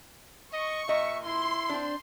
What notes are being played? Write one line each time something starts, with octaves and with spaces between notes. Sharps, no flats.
D#5 C#6
A#2 D#5 E5
E4 C6
C4 D4